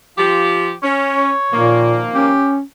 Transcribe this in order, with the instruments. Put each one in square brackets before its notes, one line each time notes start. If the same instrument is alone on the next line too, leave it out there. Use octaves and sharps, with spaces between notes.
[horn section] F3 F4 G4
[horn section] C#4 [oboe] C#5
[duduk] A#2 [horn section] D#3 F3 A#3
[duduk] C#4 [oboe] G4